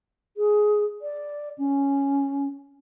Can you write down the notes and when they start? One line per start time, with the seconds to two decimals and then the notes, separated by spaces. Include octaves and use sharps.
0.37 G#4
1.01 D5
1.58 C#4